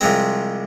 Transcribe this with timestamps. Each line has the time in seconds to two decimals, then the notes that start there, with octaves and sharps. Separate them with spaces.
0.01 C2 C3 F3 G#3 C4